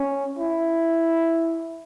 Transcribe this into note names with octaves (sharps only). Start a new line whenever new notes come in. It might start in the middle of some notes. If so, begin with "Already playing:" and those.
Already playing: C#4
E4